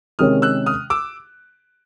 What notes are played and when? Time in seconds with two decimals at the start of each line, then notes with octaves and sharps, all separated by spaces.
0.19 C3 D#3 G#3 C#4 D#6 F6
0.42 E6 F#6
0.66 D#6 F6
0.90 D6 E6